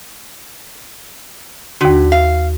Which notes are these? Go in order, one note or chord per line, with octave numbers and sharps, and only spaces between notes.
D#2 D3 F#4
F5